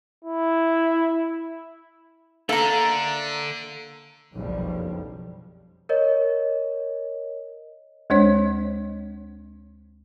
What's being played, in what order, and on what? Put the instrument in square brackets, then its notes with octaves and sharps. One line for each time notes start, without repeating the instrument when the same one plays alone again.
[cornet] E4
[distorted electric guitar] D3 [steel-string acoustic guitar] A#3 A#5 [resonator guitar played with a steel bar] A4 E5
[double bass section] F#1 B1 F2 F3 G3
[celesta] A#4 C#5 D#5
[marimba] D2 G#3 D4 C5 C#5